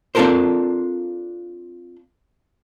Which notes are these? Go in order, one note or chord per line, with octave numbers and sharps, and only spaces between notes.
C4 D4 F4 A4 A#4 C5